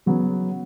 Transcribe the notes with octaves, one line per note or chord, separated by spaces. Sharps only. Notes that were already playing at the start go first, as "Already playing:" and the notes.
C#3 F#3 B3